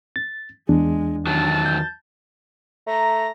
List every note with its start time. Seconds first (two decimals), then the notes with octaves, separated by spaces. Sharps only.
0.16 A6
0.69 E2 G#3 D4
1.27 D#3 F#3 A5
1.65 G6
2.87 A3 A#5